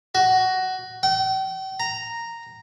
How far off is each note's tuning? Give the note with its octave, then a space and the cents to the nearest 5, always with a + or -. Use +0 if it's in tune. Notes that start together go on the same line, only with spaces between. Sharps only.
F#4 +15
G5 -40
A#5 -5